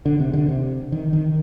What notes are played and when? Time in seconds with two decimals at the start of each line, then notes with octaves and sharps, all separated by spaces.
0.06 D3
0.20 C3
0.33 D3
0.49 C3
0.92 D#3
1.13 D#3